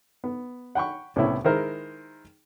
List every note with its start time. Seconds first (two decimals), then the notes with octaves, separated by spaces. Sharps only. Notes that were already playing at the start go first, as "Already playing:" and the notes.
0.24 B3
0.75 F#5 G5 B5 C#6
1.16 C2 A2 B3 C#4 E4
1.44 D#3 G#3 E4 A#4 C5